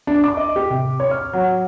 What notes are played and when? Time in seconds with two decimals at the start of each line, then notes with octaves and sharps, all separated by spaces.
0.07 D4
0.24 D6
0.37 D#5
0.56 G4
0.70 C3
1.00 C#5
1.11 F6
1.33 F#3